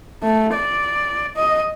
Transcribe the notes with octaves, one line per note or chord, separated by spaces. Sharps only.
A3
D5
D#5